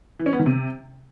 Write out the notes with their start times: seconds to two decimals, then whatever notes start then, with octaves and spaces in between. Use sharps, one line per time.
0.19 E3
0.26 C#4
0.33 B3
0.39 D#3
0.46 C3